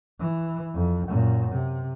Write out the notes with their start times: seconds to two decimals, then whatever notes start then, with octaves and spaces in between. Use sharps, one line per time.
0.20 E3
0.75 F2
1.08 F#2 A#2
1.52 C3